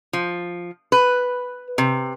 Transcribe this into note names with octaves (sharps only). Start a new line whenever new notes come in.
F3
B4
C3